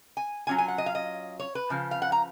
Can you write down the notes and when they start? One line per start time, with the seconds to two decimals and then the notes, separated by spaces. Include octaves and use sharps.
0.17 G#5
0.47 F#3 C#4 F4 G#5
0.58 G#5
0.68 F#5
0.78 D#5
0.86 F5
0.95 D#5
1.40 C#5
1.55 B4
1.70 C#3 F3
1.91 F5
2.02 F#5
2.12 A#5